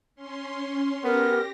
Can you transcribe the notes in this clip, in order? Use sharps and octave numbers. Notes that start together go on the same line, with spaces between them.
C#4 C6
B3 G4 A#4 A#6